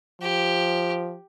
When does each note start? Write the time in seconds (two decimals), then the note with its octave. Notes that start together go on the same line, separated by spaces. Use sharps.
0.21 F3 G4